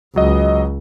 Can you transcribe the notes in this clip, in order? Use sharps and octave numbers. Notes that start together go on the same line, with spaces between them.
C#2 F#3 D#5